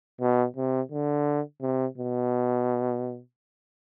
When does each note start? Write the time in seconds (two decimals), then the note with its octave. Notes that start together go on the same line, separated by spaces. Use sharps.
0.21 B2
0.57 C3
0.92 D3
1.62 C3
1.98 B2